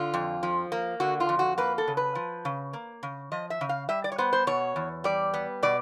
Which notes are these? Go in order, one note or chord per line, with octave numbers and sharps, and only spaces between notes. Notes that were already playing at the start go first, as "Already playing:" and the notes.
Already playing: D3 F4
F2
F3
A#3
D3 F#4
F4
F2
F#4
A#3 B4
A4
C#3
B4
F3
C#3
A#3
C#3
F3 D#5
E5
C#3
F5
G3 E5
D5
C#5
B3 C5
C5
B2 C#5
E2
G3 D5
B3
B2 D5